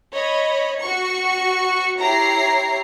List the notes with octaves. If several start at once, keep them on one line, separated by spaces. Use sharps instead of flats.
C#5 D#5 B5
F#4 C#6 C#7
E4 G4 C#5 A#5 C7